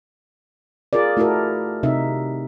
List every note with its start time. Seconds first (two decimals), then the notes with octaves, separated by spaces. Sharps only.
0.93 F4 G#4 A#4 D5
1.17 A3 E4 F#4 A4 A#4
1.83 C3 D#4 E5